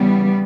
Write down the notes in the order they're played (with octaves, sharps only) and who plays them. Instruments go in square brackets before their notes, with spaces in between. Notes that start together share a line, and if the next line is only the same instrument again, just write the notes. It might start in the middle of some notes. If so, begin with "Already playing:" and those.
Already playing: [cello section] E2 C#3 E3 G3 B3